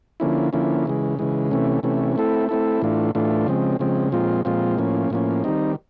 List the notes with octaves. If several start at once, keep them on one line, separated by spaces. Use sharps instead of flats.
D3 F3 A#3 C#4 E4
D3 F3 A#3 C#4 E4
C#3 E3 G#3
C#3 E3 G#3
C3 E3 A3 C#4
C3 E3 A3 C#4
A3 C4 E4 A4
A3 C4 E4 A4
A2 E3 A3 D4 F4
A2 E3 A3 D4 F4
C#3 F3 G#3 C4
C#3 F3 G#3 C4
A#2 F3 G#3 C4 F4
A#2 F3 G#3 C4 F4
A2 F3 A#3 C#4
A2 F3 A#3 C#4
D#3 G3 C4 D#4